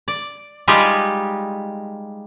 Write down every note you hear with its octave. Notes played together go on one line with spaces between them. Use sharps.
D5
G3 G#3 D#4 F4 G4